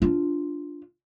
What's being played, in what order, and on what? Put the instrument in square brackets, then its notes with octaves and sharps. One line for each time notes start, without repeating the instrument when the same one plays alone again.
[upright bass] D4 F4